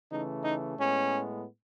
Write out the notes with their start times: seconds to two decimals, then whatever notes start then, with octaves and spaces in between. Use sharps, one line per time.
0.10 C#3 E3 A3 D#4
0.44 D#4
0.78 A2 G#3 B3 C#4